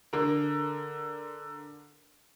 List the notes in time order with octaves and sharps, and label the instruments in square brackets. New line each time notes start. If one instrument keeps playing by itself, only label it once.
[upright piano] D3 A#4